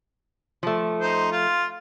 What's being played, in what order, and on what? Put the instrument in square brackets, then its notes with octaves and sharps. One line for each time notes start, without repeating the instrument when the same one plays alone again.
[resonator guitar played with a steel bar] F3 A3
[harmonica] D#4 C5
F4